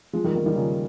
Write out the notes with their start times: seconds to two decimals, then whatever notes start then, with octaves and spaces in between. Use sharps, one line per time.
0.13 F3 G#3
0.24 D#3 G3
0.35 G3 A#3
0.46 D#3 G3
0.56 C#3 F3